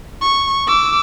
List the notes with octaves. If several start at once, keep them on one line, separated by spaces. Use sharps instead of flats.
C#6
D6 E6